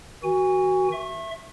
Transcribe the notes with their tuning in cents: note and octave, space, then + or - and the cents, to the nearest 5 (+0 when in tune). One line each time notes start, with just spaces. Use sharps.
D#3 +40 F#4 +15 G#5 -25
E5 +10 C#6 -35